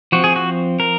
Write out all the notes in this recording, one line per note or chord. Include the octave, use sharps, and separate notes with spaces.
F3 C4 F#4
G#4
F#4
A#4